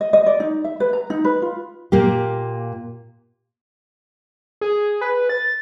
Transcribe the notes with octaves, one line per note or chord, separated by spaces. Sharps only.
D#5
D#5
D5
D#4
E5
B4
A#5
D#4
B4
F4
A#2 A#3 G4
G#4
B4
A6